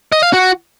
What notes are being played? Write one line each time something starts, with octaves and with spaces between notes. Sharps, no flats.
D#5
F5
F#4